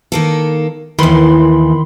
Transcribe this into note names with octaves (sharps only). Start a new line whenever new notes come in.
D#3 A#3 A4
D#2 D#3 E3 B5 C6